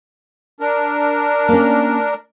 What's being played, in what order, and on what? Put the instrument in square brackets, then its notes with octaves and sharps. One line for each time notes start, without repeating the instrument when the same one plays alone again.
[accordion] D4 A#4
[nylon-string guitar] A#3 C#4